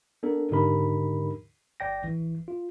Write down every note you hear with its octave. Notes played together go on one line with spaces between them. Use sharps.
B3 D4 A4 A#4
G#2 D3 D#4 G4 A#4 B5
G1 D5 G5 A#6
A1 E3
F4